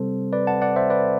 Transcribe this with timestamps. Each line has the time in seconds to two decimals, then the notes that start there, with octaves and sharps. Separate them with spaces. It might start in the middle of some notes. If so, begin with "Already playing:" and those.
Already playing: C3 G3 C4 A4 C5
0.33 B4 D5
0.47 F#5 A5
0.62 D5 F#5
0.76 C5 E5
0.90 B4 D5